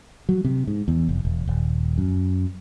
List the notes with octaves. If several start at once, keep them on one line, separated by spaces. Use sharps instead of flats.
F#3
C3
G#2
E2
F1
E1
D#1
F#2